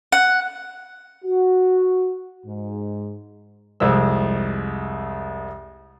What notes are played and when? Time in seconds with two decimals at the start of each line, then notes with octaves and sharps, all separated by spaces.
0.12 F#5
1.25 F#4
2.46 G#2
3.80 C2 F2 G#3 C5 E6